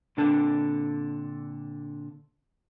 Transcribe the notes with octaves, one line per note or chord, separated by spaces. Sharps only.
A#2 D3 C4 D4 A4 A5